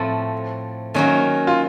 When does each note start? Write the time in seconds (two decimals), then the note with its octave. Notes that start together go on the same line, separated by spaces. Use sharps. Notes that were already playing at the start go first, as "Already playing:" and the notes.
Already playing: A2 F3 A3 C4
0.94 D#3 F#3 A#3 C#4
1.47 F4